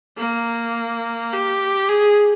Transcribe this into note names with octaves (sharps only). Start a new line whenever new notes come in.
A#3
G4
G#4